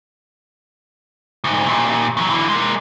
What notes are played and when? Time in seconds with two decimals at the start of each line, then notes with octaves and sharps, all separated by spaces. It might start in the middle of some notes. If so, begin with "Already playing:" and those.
1.44 D2 G#2
1.67 D#2 A#2
2.17 E2 F#3
2.30 D3 E3
2.48 G#3 A#3